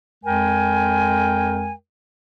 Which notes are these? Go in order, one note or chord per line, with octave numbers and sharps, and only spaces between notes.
F2 G#3 A#4 G5 G#5